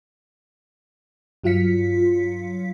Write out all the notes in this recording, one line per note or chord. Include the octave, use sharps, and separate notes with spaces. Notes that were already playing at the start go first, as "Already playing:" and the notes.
G2 F#3 F4 F5 B6 C#7